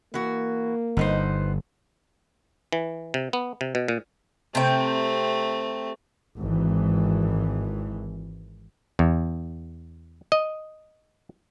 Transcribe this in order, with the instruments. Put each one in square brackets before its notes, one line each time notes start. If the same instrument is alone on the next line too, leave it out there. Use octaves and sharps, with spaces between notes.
[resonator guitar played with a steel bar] E3 F#4 [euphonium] A#3
[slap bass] G1 [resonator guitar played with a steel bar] B3 D#4 C5
[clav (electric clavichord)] E3
C3
B3
C3
B2
A#2
[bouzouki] C3 G5 [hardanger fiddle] A3 C4
[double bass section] G#1 E3
[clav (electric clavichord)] E2
D#5